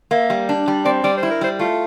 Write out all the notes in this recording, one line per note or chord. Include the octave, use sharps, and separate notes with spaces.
A#3 E5
G3
D4
G3
C4 D5
G3 D5
C5
E4
A#4
G3 C5
A3 F4